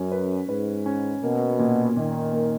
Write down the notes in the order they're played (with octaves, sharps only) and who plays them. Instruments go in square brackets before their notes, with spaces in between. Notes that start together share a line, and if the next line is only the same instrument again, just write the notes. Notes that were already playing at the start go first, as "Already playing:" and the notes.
Already playing: [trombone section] F#2 [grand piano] C#4
[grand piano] B4
[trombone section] G#2 [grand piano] B4
[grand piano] C#4
[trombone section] B2 [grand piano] A#3
[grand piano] A#2
[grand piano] A#2 [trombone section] D#3
[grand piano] A#3